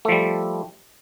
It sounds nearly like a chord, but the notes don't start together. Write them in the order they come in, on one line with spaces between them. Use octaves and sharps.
A3 F3 G3